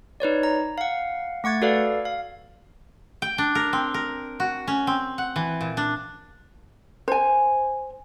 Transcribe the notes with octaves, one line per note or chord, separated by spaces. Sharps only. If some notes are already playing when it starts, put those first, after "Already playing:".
D#4 B4 C#5 D5
A#5
F5 F#5
A3 F#5 C#6 G#6 A6
F#4 A4 B4 D5 F5
F5
G5
D4
A#4
C4
A#4
F#4
C#4
C4
F#5
E3
A#2
D4
C5 G#5